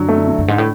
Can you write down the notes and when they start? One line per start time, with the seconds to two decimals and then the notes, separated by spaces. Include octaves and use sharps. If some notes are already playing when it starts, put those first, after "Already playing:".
Already playing: F#2 D3 F#3
0.09 A3
0.18 D3
0.28 D3
0.38 F#2
0.48 G#2
0.58 A2